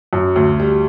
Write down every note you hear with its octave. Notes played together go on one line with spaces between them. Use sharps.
F#2
D2
G3